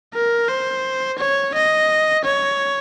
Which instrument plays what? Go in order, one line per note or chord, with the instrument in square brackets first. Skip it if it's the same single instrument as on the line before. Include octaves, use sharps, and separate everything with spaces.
[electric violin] A#4
C5
C#5
D#5
C#5